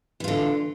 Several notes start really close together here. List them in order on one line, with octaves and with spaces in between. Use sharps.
E3 F4 D3